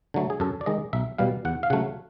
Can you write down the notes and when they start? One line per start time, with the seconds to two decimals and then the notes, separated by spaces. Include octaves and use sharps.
0.14 D3 F#3 A3
0.30 G#4
0.40 F#2 A4
0.61 D5
0.66 D#3 G#3 D#5
0.93 B1 E5
1.18 B2 G3 F5
1.45 E2 F#5
1.63 F5
1.70 C#3 F#3 A3 F#5